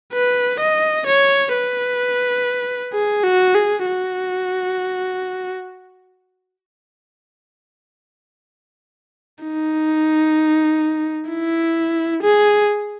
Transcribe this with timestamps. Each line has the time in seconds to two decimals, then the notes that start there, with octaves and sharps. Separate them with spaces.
0.14 B4
0.60 D#5
1.07 C#5
1.54 B4
2.93 G#4
3.24 F#4
3.55 G#4
3.86 F#4
9.44 D#4
11.30 E4
12.23 G#4